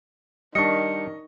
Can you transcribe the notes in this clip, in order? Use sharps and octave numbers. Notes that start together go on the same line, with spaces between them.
D#3 G3 D4 D#5 C#6 C#7